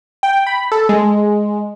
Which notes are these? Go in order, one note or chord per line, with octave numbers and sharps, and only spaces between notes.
G5
B5
A4
G#3